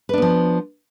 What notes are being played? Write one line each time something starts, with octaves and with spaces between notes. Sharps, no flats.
F3 B3 D4 B4